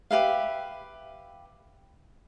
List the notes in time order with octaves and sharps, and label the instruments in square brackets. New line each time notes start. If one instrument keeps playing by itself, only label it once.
[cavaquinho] G4 B4 E5 F5